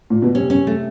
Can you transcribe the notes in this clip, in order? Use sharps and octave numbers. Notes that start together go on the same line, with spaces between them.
A#2
B2
C3 C#4
C#4
A3